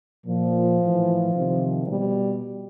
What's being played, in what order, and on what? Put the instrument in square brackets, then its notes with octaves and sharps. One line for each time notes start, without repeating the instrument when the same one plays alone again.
[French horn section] A#2 F3
A2 E3
C3 D#3
B2 G3